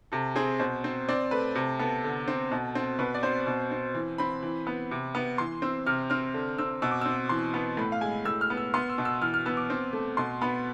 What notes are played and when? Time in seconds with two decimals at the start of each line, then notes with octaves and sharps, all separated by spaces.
0.12 C3 A4
0.36 C4 G#4
0.60 B2 C5
0.84 C4
1.09 C4 D5
1.31 A3 B4
1.55 C3 A4
1.79 B3 A4
2.04 D3
2.28 C4
2.51 B2
2.75 C4
2.99 B2 B4
3.14 D5
3.23 C4 C5
3.47 B2
3.71 C4
3.95 E3
4.18 C4 B5
4.43 E3
4.67 B3
4.91 C3
5.15 B3
5.38 E3 C6
5.62 C4 E6
5.86 C3 F6
6.10 C4 F6
6.34 D3
6.58 C4 E6
6.82 B2 E6
6.91 D6
7.01 C4 E6
7.29 E3 C6
7.54 B3
7.77 A2 B5
7.92 F5
8.01 G#3 G#5
8.25 A2 E6
8.41 F6
8.50 B3
8.57 E6
8.74 B3 C6
8.89 E6
8.98 B2
9.05 E6
9.21 E3 F6
9.34 F6
9.46 B3 E6
9.57 D6
9.70 C4
9.93 A3
10.17 B2 C6
10.41 B3 B5